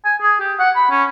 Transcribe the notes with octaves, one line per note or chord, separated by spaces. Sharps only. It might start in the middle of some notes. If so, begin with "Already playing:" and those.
G#5
G#4
G4
F#5
B5
C#4